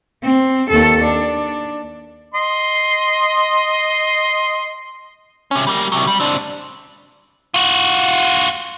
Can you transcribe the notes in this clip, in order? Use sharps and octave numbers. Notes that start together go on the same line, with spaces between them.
C4
D#2 A4
D4
D#5 C6
C3 C#4
G3 A#3
C3 F#3
G3
C4 D4
F4 F#4